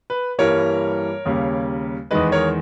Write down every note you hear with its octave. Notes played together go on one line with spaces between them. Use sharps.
B4
G2 E3 G3 A#3 A#4 C#5
D#2 C#3 G3 A#3
E2 D#3 G#3 B4 D#5
A#4 C#5